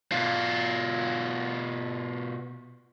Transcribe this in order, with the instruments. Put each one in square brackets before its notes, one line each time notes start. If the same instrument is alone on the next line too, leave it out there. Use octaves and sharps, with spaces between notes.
[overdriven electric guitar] B2 F4